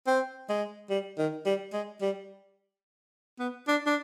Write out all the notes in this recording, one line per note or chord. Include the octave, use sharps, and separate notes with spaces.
C4
G#3
G3
D#3
G3
G#3
G3
B3
D4
D4